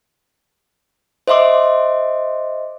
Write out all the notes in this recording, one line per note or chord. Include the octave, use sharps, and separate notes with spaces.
C5 D#5 E5 C6 D6